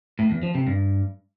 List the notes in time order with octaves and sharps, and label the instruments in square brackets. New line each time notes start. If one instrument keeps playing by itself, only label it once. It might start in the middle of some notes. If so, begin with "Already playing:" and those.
[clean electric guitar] A2
E2
F3
C3
G2